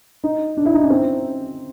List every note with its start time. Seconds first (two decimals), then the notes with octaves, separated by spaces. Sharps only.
0.24 D#4
0.57 D4
0.65 E4
0.74 D#4
0.83 C#4
0.90 C4